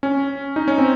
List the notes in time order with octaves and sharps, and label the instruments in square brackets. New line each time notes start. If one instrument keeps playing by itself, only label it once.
[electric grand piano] C#4
D#4
C#4
C4